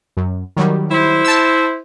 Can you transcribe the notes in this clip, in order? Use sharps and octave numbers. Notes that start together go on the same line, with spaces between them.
F#2
D#3 F#3 G3
E4 C5
A5 E6